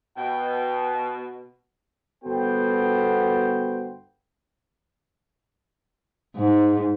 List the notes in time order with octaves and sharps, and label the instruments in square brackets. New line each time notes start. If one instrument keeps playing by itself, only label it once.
[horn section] B2 [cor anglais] G5
[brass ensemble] G1 B3 F#4 A4 C5 G5
[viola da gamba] G#2